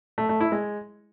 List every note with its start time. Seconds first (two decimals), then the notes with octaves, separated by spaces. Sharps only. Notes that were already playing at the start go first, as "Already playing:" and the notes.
0.18 A3
0.29 A3
0.41 E4
0.52 G#3